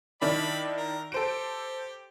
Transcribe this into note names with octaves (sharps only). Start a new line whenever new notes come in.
D#3 D4 E4 D5 B5
A#4
G4 A4 C5 D7